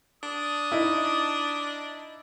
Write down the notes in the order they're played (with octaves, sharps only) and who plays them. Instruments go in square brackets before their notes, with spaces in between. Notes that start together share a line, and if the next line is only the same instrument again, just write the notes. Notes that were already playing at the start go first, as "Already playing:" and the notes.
[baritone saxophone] D4 [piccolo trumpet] D#6
[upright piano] D#4 E4